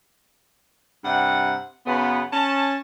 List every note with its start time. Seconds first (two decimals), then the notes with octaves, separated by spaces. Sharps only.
1.04 G2 C3 F#5
1.86 F#2 C#3 B3
2.33 C#4 A5